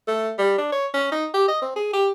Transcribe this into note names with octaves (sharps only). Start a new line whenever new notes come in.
A3
G3
D4
C#5
C#4
D#4
G4
D#5
C4
G#4
G4